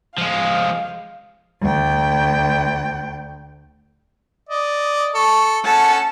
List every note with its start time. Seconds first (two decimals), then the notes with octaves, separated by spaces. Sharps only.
0.18 F3 G#3 F5
1.62 D2 G5
4.49 D5 D#5
5.14 A4 C#6
5.65 C#4 A4 F#5 A5